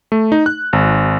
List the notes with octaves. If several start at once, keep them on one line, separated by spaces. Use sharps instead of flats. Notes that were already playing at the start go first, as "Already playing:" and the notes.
A3
D#4
F#6
G#1